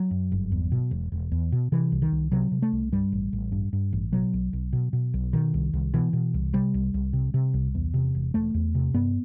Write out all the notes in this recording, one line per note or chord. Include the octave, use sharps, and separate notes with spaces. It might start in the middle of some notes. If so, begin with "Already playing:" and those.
Already playing: F#3
F#2
G1
E2
B2
E1
E1
E2
B2
C3 E3
C2
D#3
C2
C3 F#3
C3
A3
C2
G2 G3
A1
A1
G2
G2
A1
B2 F#3
B1
B1
B2
B2
B1
B2 D#3
C2
C2
B2 E3
B2
C2
C3 G3
C2
C2
C3
C3
C2
E2
C3
E1
E1 A3
E2
C3
G2 B3